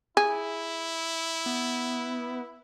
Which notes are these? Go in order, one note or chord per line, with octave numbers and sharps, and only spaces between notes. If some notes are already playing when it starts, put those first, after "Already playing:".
E4 G#4
B3